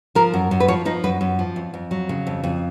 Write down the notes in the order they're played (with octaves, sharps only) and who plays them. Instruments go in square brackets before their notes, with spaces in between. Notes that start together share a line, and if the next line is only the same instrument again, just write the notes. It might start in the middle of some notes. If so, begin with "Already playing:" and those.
[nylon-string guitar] F3 A#4
F#2
F#2
B4
F3 C#5
F3 D#4
F#2 B4
F#2
F3
F2
F2
F#3
C#3
F2
F2